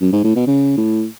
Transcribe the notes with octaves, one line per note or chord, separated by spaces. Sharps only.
F#2
G#2
A2
B2
C#3
A2